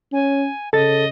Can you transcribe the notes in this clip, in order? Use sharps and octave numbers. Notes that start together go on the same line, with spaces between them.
C#4 G#5
C#3 A4 D#5 A6